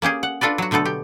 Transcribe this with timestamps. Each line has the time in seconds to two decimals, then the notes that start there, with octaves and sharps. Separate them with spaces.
0.02 A#3 C#4 G4 G#4
0.23 F#5
0.41 D4 F4 A4 B4 D5
0.58 F#3 F#4
0.71 B2 D3 A3 B3 A4
0.85 G4